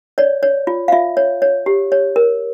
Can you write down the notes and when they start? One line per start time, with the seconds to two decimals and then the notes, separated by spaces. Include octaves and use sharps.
0.18 C#5 D5
0.43 C#5
0.67 F4
0.88 F5
0.92 F4 E5
1.17 C#5
1.42 C#5
1.66 G4
1.92 C#5
2.16 A#4